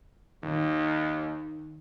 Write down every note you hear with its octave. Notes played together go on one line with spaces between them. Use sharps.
D#2 D#3